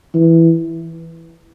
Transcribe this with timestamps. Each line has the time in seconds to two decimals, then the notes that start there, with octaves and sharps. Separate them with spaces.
0.15 E3